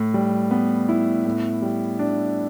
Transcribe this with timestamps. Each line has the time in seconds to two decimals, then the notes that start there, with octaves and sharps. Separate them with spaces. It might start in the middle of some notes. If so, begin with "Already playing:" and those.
Already playing: A2
0.14 G3
0.51 B3
0.89 E4
1.25 A2
1.62 G3
1.99 D4